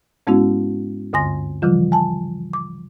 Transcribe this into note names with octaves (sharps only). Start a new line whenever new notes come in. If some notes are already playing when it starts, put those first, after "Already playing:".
G#2 G#3 B3 C#4 E4 F#4
D2 G2 D3 G#5 C6 A#6
C#3 E3 F3 G3 F4
G#5 A5
D6